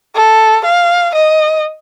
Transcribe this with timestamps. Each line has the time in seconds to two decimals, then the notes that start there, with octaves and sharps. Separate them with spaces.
0.15 A4
0.65 F5
1.15 D#5